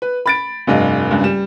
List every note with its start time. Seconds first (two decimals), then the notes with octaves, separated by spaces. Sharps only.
0.02 B4
0.26 B5 A6 D7
0.67 F1 G2 D#5 F5
1.10 F#1 C#2 G2
1.24 G3 E7